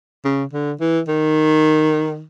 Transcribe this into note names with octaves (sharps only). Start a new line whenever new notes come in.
C#3
D3
E3
D#3